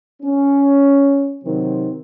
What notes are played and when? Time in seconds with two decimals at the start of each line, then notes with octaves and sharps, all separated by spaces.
0.22 C#4
1.44 C3 D#3 F#3 C4